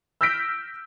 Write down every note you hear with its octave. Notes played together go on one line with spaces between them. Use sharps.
E6 F6 G6 A#6 B6 D7